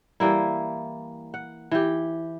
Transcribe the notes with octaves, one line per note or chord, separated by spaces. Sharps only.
E3 G3 A#3 E4
F#5
E3 G4